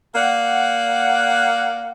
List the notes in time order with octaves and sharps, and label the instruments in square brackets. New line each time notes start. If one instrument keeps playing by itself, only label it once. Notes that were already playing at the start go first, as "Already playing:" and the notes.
[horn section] A#3 D5 F#5